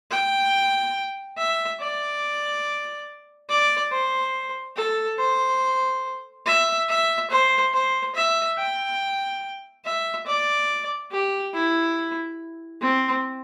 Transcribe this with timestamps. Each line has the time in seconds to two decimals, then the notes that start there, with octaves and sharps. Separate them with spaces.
0.11 G5
1.37 E5
1.80 D5
3.49 D5
3.92 C5
4.76 A4
5.19 C5
6.46 E5
6.89 E5
7.31 C5
7.73 C5
8.15 E5
8.58 G5
9.85 E5
10.27 D5
11.12 G4
11.54 E4
12.81 C4